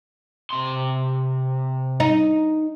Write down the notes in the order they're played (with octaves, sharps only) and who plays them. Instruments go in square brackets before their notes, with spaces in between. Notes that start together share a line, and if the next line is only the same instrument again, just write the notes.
[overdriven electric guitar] C3 C6
[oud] D#4